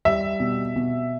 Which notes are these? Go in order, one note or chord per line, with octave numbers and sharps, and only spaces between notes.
G3 E5
B2
B2